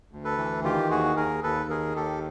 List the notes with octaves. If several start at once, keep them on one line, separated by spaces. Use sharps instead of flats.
D2
A4 B4
E3
D#3 F4 G4
D#2 F#4 G#4
D#2 G#4 A#4
D#2 A4 B4
D#3 G#4 A#4
D#2 G4 A4